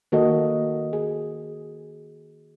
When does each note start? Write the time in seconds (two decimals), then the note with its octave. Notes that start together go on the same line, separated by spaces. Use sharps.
0.12 D#3 A#3 F#4 A4 D#5
0.93 G#4